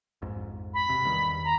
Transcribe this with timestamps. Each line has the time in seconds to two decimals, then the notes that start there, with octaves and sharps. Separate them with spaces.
0.22 A#1 F2 G#2
0.74 B5
0.89 E1 C3
1.04 E2 G2 D#3
1.45 A#5